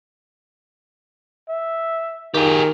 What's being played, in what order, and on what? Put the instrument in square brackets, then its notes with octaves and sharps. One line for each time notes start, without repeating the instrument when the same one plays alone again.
[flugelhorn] E5
[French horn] D#3 [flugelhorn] F4 [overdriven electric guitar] G4 G#4